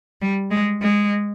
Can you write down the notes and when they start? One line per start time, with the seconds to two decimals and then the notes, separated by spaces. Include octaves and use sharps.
0.22 G3
0.51 G#3
0.82 G#3